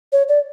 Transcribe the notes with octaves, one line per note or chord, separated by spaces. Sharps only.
C#5
D5